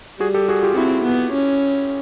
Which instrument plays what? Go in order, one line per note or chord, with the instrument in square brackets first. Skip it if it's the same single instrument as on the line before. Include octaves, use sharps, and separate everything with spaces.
[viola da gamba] G3 [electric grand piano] F#4 G#4
[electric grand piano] G4 A4
F#4 G#4
F4 G4
[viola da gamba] C4 [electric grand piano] E4 F#4
[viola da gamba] B3
C#4